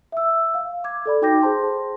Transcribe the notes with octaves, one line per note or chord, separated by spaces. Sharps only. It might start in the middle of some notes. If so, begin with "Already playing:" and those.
E5 E6
F5
D6 G#6
A4 D5 B5
D#4 F#4 G5 D6 G6 A#6
G#4 C5 A5 C6